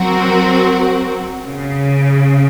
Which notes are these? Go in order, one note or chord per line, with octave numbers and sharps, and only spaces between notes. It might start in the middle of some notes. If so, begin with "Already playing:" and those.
Already playing: F#3 C4 F#4 A#4
C#3